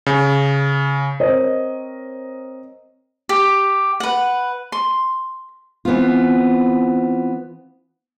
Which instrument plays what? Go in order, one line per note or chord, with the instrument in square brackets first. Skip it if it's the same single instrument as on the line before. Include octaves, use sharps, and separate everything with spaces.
[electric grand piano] C#3
[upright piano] C4 A#4 C#5 D#5
[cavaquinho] G4
B4 F#5
C6
[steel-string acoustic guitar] E3 B3 C4 F4